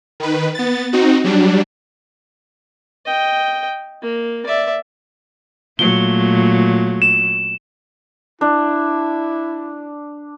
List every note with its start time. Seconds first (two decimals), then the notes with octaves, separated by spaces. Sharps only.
0.20 D#3 B4
0.55 B3 A6
0.93 C4 D#4 F#4
1.24 F#3 G3 D4
3.05 D#5 G5
4.02 A#3
4.46 D5 E5
5.79 A#2 F#3 A3 G7
7.02 E7
8.41 D4 E4